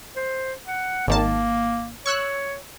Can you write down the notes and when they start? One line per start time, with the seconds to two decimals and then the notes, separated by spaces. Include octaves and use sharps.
0.16 C5
0.67 F#5
1.08 G#1 D#3 A#3 A5
2.06 C#5 C#6 E6 F#6